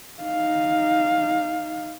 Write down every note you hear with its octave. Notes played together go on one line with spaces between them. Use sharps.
D#4 F5